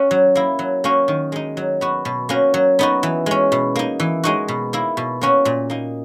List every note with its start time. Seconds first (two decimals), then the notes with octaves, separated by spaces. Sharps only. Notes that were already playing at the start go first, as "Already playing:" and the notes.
Already playing: C#4 F#4
0.11 F#3
0.35 A#3 E4
0.59 F#3
0.84 A#3 C#4 F#4
1.08 D#3
1.32 G#3 D#4
1.57 F#3
1.81 B3 F#4
2.05 B2
2.29 A#3 C#4 F#4
2.54 F#3
2.79 B3 D#4 F#4
3.03 E3
3.26 G#3 C#4
3.52 B2
3.75 A#3 D#4
4.00 E3
4.24 G#3 D#4 F#4
4.48 B2
4.73 A#3 E4
4.97 B2
5.21 A#3 C#4 F#4
5.45 A#2
5.70 A#3 D#4